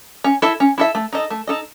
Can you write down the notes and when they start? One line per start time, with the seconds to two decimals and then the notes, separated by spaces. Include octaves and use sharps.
0.24 C#4
0.42 E4 A4 E5
0.60 C#4
0.78 E4 A4 E5
0.95 A3
1.13 D#4 A4 D#5
1.30 A3
1.47 D#4 A4 D#5